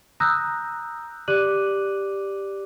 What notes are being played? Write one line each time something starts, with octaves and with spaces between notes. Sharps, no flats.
A#5 D#6 E6 F#6 G6 A#6
G4 D5 D6 F#6 D#7 F#7